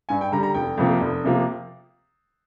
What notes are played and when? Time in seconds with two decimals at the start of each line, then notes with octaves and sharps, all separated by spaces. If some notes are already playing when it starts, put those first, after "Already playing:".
0.09 G2 G#5
0.21 G5
0.32 D3 G3 A#5
0.43 A#5
0.54 F1 G5
0.77 F2 C3 F3 A#3
1.01 F1
1.24 C3 F3 A#3